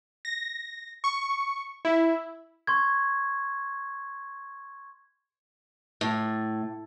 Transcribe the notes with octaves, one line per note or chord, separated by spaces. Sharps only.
A#6
C#6
E4
C6 C#6 G#6
A2